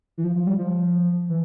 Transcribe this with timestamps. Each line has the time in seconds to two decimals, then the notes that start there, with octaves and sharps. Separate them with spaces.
0.18 E3
0.24 F3
0.36 F3
0.47 G3
0.59 F3
1.30 E3